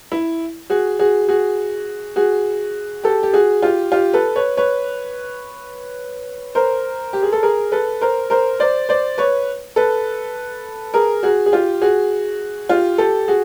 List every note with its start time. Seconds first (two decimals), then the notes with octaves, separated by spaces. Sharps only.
0.12 E4
0.70 F#4 G#4
0.99 F#4 G#4
1.28 F#4 G#4
2.16 F#4 G#4
3.04 G4 A4
3.23 G4
3.33 F#4 G#4
3.62 F4 G4
3.92 F4 G4
4.13 A4 B4
4.36 B4 C#5
4.57 B4 C#5
6.55 A#4 C5
7.13 G4
7.23 G#4
7.33 A4
7.43 G#4 A#4
7.72 A4 B4
8.01 A#4 C5
8.30 A#4 C5
8.60 C5 D5
8.89 C5 D5
9.18 B4 C#5
9.76 A4 B4
10.94 G#4 A#4
11.23 F#4 G#4
11.46 G#4
11.52 F4 G4
11.82 F#4 G#4
12.69 F4 G4
12.98 G4 A4
13.28 F#4 G#4